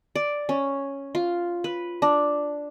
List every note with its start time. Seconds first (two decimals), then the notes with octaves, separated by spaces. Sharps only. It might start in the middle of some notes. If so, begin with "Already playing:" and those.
0.16 D5
0.49 C#4
1.15 F4
1.64 B4
2.02 D4